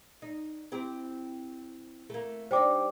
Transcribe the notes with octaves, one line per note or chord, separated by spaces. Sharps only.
D#4
C4 E4 G4
A3 A#3
G3 D4 D#4 C5 G5 D6